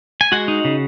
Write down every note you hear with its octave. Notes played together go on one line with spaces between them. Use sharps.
G#5
G#3 F#4 F#5
D#4
C#3